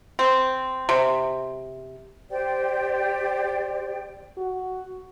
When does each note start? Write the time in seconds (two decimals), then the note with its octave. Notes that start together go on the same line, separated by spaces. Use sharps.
0.19 C4
0.89 C3
2.30 G4 C5 D5 G5
4.37 F#4